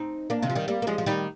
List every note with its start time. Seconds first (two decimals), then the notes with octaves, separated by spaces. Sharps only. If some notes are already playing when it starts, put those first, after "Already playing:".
Already playing: C4 D#4
0.30 A#3 D4
0.42 C3 D#3
0.50 F3
0.55 D#3 G3
0.68 G3 A#3
0.82 A#3
0.87 F3 G#3
0.98 F3
1.06 D#3 G3